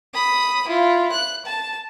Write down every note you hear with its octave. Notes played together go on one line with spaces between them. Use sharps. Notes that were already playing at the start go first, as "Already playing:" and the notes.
B5 D#6
E4 F4
F#6
A5